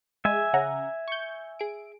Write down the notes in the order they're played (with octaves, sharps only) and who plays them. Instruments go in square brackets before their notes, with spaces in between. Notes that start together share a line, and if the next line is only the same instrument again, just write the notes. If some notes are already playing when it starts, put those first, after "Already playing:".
[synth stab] G#3 [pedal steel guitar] E5 G#5
[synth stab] C#3 F#5 A#5
C#6 G6
G#4 D7